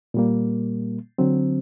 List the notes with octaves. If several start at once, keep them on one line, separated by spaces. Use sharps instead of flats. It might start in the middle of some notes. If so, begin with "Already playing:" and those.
A#2 G3 A#3
D3 F#3 C4